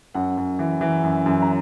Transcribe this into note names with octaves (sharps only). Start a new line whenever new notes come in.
F#2 F#5
F#2
E3
E3
F#2
F#2
A#5